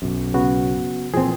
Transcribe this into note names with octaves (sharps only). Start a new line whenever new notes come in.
B1 F#2
C#3 B3 F#4
A#2 E3 F3 C4 G#4